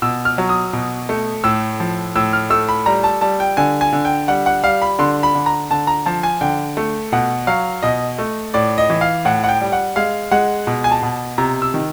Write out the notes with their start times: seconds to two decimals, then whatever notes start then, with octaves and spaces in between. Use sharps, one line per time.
0.02 B2 E6
0.25 F6
0.38 F#3
0.49 D#6
0.73 B2
1.09 A3
1.44 A2 E6
1.80 F3
2.16 A2 E6
2.33 F6
2.50 A3 E6
2.69 B5
2.86 G3 A#5
3.04 A5
3.21 G3 A5
3.40 G5
3.57 D3 G#5
3.81 G#5
3.93 D3
4.05 G5
4.28 G3 F#5
4.46 F#5
4.63 G3 F5
4.82 B5
4.99 D3 C6
5.23 B5
5.35 D3
5.46 A#5
5.70 D3 A5
5.87 A#5
6.06 F3 A5
6.23 G#5
6.41 D3 G5
6.77 A3
7.12 B2 F#5
7.47 F#3 F5
7.83 B2 D#5
8.18 A3
8.54 A2 D5
8.78 D#5
8.90 E3
9.01 F5
9.25 A2 F#5
9.44 F#5
9.49 G5
9.61 G3
9.72 F#5
9.96 G#3 F5
10.32 G#3 F#5
10.67 B2
10.84 G#5
10.91 A5
11.02 B2
11.38 C3 A#5
11.62 E6
11.74 D#3